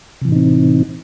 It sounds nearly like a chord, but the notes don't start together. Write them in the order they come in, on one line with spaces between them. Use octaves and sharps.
C3 E3 A2 D#4 C4